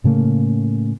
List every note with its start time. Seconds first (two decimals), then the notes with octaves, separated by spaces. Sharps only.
0.04 A2 C#3 A3 A#3